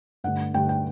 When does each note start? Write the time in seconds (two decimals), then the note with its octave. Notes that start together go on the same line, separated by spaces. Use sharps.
0.24 G2 D3 A3 F#5
0.54 G2 D3 A3 G5
0.69 G5